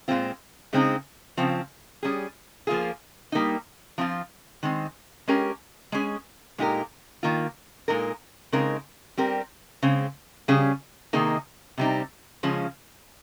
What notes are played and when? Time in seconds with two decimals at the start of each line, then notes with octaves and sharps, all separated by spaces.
0.08 A#2 G#3 C4 F4
0.73 C#3 G#3 C4 D#4
1.37 C#3 F3 C4
2.03 G3 C#4 G#4
2.67 F3 A#3 F4 G#4
3.32 G3 A#3 D#4
3.98 F3 C4 F4
4.63 D#3 G#3 C4
5.28 G#3 C#4 G4 A#4
5.92 G#3 C#4 G#4
6.58 A#2 G#3 D#4 G4 A#4
7.23 D#3 A#3 F4
7.88 A#2 G#3 D#4 A#4
8.52 C#3 G#3 C4 D#4 A#4
9.17 G3 C4 G4 A#4
9.83 C#3 G#3 C4
10.48 C#3 G3 C#4 G#4
11.13 C3 D#3 A#3 D#4 G#4
11.78 C3 G3 C4 D#4
12.43 C#3 F3 G#3 C#4